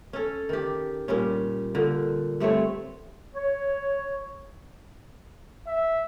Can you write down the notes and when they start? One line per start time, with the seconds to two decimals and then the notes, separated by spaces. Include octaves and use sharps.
0.13 C#4 A4
0.49 D#3 G4
1.08 A#2 G3 C#4
1.75 A#2 D3
2.40 G2 A3 C4 C#5
3.35 C#5
5.67 E5